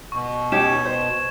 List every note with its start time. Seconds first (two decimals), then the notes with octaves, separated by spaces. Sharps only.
0.12 B2 C#6
0.52 C#4 D#4 G4 G#6 E7
0.86 C5